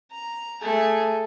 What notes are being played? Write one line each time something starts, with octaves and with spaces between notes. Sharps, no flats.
A#5
A3 G#4